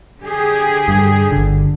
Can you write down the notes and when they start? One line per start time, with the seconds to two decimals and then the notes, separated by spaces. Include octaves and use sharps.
0.21 D3 G4 G#4
0.88 G2
1.32 G1 D3